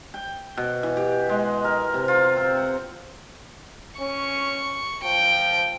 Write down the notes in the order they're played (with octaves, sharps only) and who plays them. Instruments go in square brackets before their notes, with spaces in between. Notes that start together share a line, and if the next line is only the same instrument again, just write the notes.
[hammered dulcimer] G5
B2
E3
G4
G#3
A#4
C3
F4
C4
F#5
[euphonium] C#4 [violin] C#6
[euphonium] F3 [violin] G5